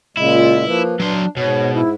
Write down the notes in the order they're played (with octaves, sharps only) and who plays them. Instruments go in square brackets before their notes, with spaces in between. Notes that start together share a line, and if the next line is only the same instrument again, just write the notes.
[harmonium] A#2 C#3 G#3 [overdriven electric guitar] E4
[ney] F4
[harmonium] F3 A#3 [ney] B4
[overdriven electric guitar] F#3 C6 [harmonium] D4
[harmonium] G#2 [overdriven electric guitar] B2 [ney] C#5
[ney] E4